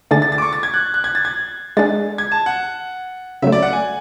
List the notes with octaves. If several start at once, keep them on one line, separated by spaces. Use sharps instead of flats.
D3 A3 D4 G#4 A6
A6
A6
D6
C#6
A6
G#6
F#6
F#6
G#6
A6
G#6
G#3 D4 G#4 A6
G#6
A5
F#5
C#3 F#3 A3 E5
D5
F#5
G#5